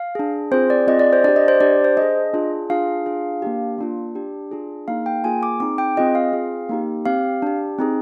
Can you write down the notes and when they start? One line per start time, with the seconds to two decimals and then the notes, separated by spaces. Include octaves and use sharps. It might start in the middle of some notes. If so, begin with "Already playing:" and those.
Already playing: F5
0.15 D4 G#4
0.51 C4 F4 G#4 C5
0.70 D5
0.87 C4 F4 G#4 D#5
0.99 D5
1.13 C5
1.24 D4 D5
1.28 G4
1.36 D#5
1.48 C5
1.61 D4 G4 D5
1.84 C5
1.97 D4 G#4 D#5
2.34 D4 F4 G#4
2.70 D4 F4 G#4 F5
3.06 D4 F4 G#4
3.42 A#3 D4 G4
3.78 A#3 D4 F4
4.15 D4 G4
4.51 D4 F4 G#4
4.88 A#3 D#4 G#4 F5
5.06 G5
5.24 A#3 F4 G#4 G#5
5.43 D6
5.60 C4 D#4 G#4 D6
5.78 G5
5.97 C4 F4 G#4 D#5
6.15 F5
6.33 C4 F4 G#4
6.69 A#3 D#4 G4
7.06 C4 G4 F5
7.42 D4 G4
7.79 C4 D#4 G#4